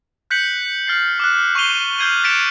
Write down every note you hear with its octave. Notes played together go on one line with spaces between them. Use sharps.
F#6 G6 B6 C#7 F#7
F6 A6 C7
D6 F6 F#6
C#6 F6 C7 D#7 F7 G7
F6 G6 G#6 C7 D#7 F#7
A6 B6 C#7 D7 E7 F7